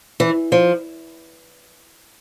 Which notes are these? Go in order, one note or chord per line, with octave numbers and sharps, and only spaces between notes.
E3
F3